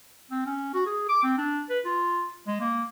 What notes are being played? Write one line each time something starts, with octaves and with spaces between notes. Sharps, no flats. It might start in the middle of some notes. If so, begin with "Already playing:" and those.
C4
C#4
F#4
G#4
D6
C4
D4
B4
F4
G#3
A#3